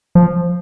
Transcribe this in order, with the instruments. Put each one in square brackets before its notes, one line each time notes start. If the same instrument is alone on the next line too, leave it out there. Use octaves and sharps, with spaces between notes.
[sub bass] F3